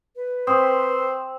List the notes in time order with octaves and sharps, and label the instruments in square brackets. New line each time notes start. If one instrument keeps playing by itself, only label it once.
[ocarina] B4
[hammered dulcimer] C4 [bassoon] C5 [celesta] C#6 D#6